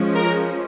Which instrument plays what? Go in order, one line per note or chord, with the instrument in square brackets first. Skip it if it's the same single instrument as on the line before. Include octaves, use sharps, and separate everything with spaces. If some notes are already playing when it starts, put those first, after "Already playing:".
Already playing: [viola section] F3 G#3 C#4
A#4